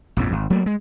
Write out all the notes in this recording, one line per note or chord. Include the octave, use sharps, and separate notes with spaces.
A#1 F2 G#2
G#1
F#3 A3 A#3
G#3